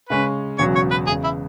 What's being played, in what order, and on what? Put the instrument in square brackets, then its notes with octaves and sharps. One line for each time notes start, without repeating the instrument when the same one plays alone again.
[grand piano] C#3 G#3 C#4 [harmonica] B4
[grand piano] E1 E2 C#3 F#3 [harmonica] C#5
[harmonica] C#5
B4
[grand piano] E2 C#3 G#3 [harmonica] G#4
[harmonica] E4